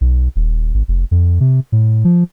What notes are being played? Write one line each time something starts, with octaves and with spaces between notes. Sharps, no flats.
B1
D#1
G#1
F1
F2
C3
A2
F3